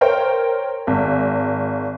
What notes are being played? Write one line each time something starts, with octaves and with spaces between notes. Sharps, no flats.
A#4 C5 C#5 G5
G#1